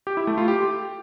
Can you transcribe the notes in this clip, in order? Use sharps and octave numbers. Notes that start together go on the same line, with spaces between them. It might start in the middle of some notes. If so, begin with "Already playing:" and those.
G4
E4
A3
F4
G4